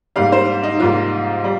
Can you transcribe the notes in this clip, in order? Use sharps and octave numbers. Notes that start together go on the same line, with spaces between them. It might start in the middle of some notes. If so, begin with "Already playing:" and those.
G#2 G3 A#3 F5
C5
D#4
G#2 G3 A#3 F4
G3